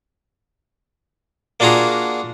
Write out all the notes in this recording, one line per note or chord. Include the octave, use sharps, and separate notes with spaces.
A#3 D4 F4 F#4 G#4 A#5